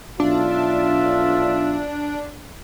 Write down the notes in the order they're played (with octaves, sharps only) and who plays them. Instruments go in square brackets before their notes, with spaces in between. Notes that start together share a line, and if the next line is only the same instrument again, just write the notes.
[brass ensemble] B1 F4 E5 [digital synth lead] D4